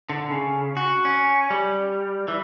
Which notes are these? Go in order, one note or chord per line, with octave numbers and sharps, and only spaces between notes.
D3
C#3
F#4
C#4
G3
E3